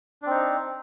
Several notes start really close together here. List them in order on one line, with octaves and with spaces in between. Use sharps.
D4 C4 D#4